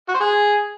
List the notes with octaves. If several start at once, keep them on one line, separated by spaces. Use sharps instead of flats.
F#4
C5
G#4